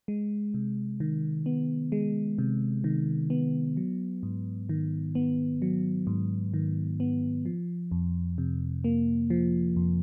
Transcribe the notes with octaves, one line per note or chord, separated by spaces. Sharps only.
G#3
C3
D#3
B3
G#3
C3
D#3
B3
F#3
G#2
D#3
B3
F#3
G#2
D#3
B3
F3
F2
C3
A#3
F3
F2